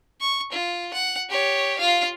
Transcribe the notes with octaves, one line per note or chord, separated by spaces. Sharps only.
C#6
F4
F#5
G4 C#5
F4 F5